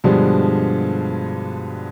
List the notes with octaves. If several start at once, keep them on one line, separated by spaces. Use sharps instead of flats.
G2 B2 D3 F3 G3 G#3